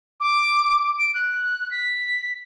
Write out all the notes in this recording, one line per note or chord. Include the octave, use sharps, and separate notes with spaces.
D6
D7
F#6
B6